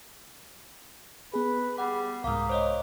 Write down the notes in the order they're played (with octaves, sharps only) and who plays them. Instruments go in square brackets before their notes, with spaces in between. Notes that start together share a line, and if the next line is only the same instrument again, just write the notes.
[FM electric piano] B3 G#4 [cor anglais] B4
[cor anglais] G3 [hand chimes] F#5
[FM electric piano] C2 G#2 [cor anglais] A#3 [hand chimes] F5 D#6
[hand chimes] C5 C#5 D#5